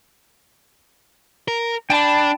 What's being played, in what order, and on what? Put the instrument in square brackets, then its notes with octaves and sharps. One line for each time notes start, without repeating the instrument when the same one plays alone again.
[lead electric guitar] A#4
[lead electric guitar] D4 [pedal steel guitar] G5 A5 B5